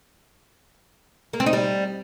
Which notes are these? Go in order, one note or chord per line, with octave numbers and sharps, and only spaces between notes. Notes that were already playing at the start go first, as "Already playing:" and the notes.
A#3
C4
D#4
G3